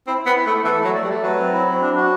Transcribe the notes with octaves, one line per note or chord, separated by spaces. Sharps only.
C4 E4
B3 E4
E4
A3
A4
E3 A4
A3
F#3
D5
G3
A3
F#3 B4
C4
E4
C4
D4
F#4